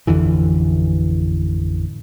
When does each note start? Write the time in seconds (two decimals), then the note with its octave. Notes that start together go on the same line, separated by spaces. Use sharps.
0.07 A1 F2 D3 E3